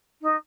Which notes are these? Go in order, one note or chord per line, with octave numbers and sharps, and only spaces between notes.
D#4